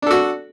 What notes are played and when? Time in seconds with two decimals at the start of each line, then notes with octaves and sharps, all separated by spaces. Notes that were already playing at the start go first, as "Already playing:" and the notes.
0.02 D4
0.07 A4
0.11 F#4